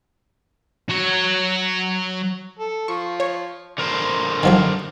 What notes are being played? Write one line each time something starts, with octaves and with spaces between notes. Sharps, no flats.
F#3 C#5
A4
F3 C#6
C#5
D3 A#4 C5
D#3 F3 F#3